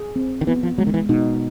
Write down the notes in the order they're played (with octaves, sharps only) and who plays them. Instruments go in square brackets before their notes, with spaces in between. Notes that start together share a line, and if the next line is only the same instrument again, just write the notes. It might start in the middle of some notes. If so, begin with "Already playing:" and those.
Already playing: [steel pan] G#4
C4
[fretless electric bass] D#3
[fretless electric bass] E3 [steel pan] B3
[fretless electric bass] F3
[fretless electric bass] F#3 [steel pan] G#3
[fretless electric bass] D#3
E3
[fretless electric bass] B2 [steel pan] D#4